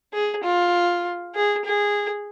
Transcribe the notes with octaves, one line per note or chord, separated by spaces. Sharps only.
G#4
F4
G#4
G#4